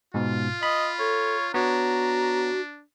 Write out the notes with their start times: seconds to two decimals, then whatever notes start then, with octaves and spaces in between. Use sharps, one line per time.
0.14 G#2 B2 F4
0.63 D#5 B5
0.99 A4 C#5
1.54 B3 D4 F#4 C#5 A#5